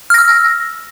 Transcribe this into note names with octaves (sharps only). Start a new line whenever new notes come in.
E6 F6 A#6